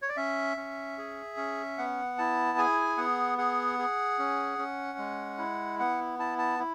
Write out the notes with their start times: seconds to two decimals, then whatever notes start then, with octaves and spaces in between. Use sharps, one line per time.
0.02 C#5
0.09 D5
0.17 C#4 E5
0.57 C#4
0.98 G#4
1.37 C#4
1.78 B3 F#5
2.18 E4 A5
2.58 G#4 G#5
2.97 B3 F#5
3.38 G#4 F#5
3.79 G#4
4.19 C#4
4.58 C#4
4.98 G#3
5.38 E4
5.79 B3 F#5
6.19 E4 A5
6.38 A5
6.59 E4